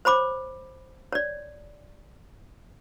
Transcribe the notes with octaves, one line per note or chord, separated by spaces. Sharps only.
C5 C#5 B5 D6
C#5 D5